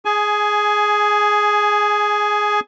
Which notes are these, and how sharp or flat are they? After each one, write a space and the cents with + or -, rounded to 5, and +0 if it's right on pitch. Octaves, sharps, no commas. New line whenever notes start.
G#4 +0 G#5 +20